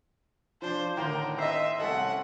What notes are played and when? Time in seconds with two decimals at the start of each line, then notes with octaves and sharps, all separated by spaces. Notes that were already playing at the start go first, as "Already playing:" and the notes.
0.62 F3 D4 C5
0.97 A2 D3 D#3 A#4 G5
1.38 C5 D#5 E5
1.80 C2 C#4 A4 F#5